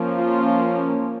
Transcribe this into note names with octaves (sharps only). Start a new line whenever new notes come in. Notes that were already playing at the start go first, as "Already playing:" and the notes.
Already playing: F3 A#3 C#4
F4